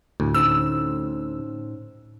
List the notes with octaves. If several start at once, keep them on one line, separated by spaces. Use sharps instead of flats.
D2 A2
C#4 D#4 C5 E6